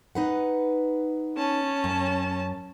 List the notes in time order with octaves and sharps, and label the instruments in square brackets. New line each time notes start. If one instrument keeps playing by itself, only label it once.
[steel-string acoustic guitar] D#4 B4 F#5
[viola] C#4 A5
[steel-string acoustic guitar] F#2